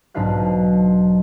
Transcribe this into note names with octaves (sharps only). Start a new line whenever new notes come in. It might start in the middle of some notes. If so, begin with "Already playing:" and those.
B1 G#2 D4 B4 F5 F#6